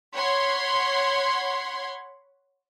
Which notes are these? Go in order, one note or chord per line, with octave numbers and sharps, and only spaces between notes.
C#5 F#5 B5 C6 G#6